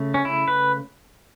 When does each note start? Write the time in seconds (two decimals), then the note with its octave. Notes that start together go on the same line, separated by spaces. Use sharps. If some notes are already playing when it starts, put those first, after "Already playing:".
Already playing: C#3 A3
0.14 C#4
0.25 E4
0.48 B4